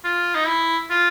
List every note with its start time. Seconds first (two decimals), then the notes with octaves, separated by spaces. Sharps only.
0.05 F4
0.35 D#4
0.47 E4
0.90 F4